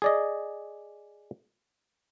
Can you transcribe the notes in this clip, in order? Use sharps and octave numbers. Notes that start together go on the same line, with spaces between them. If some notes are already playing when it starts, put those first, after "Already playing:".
G#4 D5 D#5